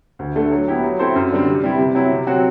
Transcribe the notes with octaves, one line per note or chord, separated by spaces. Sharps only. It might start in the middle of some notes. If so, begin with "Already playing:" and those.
D2
D3 A3
F#3
B3 E4 G4
F#3
C4 E4 A4 C5
F#2
D3 G3 C4
C3
G3 C4 E4
C3
F#3 C4 E4
C3
F#3 C4 F#4